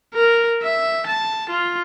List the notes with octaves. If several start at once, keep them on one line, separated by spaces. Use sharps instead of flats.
A#4
E5
A5
F4